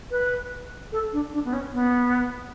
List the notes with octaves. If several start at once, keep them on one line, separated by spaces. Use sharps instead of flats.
B4
A4
D4
D4
B3
C#4
B3